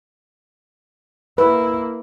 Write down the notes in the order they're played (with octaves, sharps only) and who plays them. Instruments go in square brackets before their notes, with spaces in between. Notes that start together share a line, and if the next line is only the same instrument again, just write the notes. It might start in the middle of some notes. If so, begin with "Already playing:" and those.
[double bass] A#3 E4 [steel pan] B4